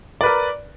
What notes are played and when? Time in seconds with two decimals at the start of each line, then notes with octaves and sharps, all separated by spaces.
0.21 D5
0.23 B4
0.26 A#4